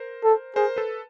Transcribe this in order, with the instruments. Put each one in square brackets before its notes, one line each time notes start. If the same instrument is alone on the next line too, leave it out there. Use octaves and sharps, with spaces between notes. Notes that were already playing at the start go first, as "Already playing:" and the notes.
Already playing: [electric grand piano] A#4 C5
[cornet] A4
[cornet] G#4 [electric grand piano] A#4 C5
[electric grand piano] A4 B4